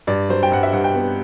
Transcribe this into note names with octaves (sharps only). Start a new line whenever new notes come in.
G2 D5
F#3 C5
G5
G2 F#5
E5
G2 F#5
G5
B3